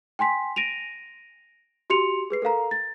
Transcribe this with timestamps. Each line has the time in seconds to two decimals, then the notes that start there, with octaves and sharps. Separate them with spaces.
0.19 G5 G#5 C6 B6
0.56 A#6 D7 D#7 F7
1.90 F#4 G4 C6 C#7 F7
2.30 G#4 B4 C7
2.42 A4 A#4 F5 A#5
2.71 A6